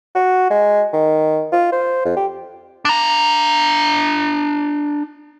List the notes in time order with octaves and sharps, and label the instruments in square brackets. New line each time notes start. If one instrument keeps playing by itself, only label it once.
[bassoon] F#4
G#3
D#3
F4
C5
F2
G4
[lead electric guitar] D4 A#5